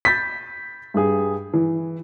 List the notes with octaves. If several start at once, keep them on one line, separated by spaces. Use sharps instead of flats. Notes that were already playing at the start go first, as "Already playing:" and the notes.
B5 G6 A6 B6
G2 G#4
E3